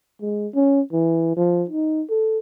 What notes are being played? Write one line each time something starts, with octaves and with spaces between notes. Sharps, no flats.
G#3
C#4
E3
F3
D#4
A4